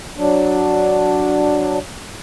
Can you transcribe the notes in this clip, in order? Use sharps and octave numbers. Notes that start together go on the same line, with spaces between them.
F#3 D4